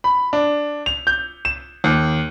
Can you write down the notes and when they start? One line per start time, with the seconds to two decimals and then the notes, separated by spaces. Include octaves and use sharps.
0.04 B5
0.33 D4
0.86 F7
1.07 G6
1.45 E7
1.84 D#2